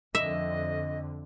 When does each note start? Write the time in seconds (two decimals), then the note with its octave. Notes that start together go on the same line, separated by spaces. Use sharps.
0.15 F2 D3 D#5 E5